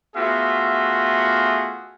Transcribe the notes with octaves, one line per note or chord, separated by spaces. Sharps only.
A3 B3 F4 F#4 G#4 E5